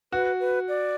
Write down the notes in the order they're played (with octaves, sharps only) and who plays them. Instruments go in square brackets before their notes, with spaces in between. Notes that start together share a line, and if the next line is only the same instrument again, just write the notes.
[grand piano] F#4 [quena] B4
[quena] B4
D5